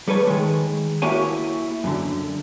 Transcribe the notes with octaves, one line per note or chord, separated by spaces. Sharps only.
G3 A4 B4 C#5
D#3 G#3
A#3 E4 F#4 G4 C#5 G#5
F#2 D3